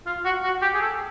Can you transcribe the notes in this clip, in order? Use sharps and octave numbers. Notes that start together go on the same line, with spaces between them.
F4
F#4
F#4
G4
G#4
A4